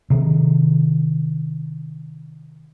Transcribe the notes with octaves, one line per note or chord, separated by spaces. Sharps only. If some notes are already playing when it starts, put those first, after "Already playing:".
C3 D#3